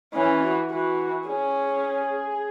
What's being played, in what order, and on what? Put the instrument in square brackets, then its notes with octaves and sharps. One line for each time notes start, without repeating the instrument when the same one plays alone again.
[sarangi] E3 [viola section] C#4
[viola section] F#4
[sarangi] E3 [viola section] F#4
[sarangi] C#4 [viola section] G#4